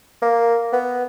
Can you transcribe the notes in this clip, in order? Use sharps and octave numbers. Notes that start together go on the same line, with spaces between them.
A#3
B3